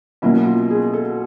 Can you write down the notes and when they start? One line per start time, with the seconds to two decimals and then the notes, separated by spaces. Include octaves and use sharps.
0.22 B2 F#3 A#3 C#4 E4
0.46 F4
0.70 G#4
0.93 A4